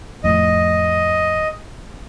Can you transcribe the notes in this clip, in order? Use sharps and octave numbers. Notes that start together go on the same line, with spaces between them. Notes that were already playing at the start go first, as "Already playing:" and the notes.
F2 A2 D#5